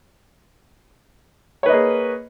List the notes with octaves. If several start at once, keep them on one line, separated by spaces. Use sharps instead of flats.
A#3 G#4 B4 C#5 D#5